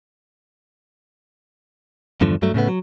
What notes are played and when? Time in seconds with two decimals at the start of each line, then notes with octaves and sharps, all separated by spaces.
2.21 E2 G2 D3 F3
2.42 G2 F#3 A3
2.54 A2 C#3 A3 B3
2.68 F#3